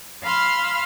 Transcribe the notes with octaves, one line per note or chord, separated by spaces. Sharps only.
F5 B5 C6 E6 F6